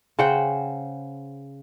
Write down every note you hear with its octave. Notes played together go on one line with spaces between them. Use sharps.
C#3 C5 F#5 G5